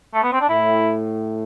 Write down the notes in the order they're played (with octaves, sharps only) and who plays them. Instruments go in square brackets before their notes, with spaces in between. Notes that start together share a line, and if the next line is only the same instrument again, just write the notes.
[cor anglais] A3
B3
C4
D4
[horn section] A2 [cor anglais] E4